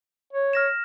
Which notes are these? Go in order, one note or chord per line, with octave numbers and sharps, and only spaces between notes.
C#5
F6 A#6 E7